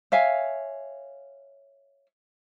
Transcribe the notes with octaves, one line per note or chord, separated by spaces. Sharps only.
C#5 E5 F5 G#5